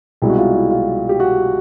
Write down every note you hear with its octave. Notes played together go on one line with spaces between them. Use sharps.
C2 B2 G#3 E4
F#4
F4
E4
F4
G4
F#4